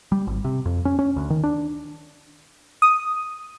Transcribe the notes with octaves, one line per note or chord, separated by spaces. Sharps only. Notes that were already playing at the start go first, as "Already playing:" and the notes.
G3
G#1
C3
F2
C#4
C#4
D2
D#3
D4
D#6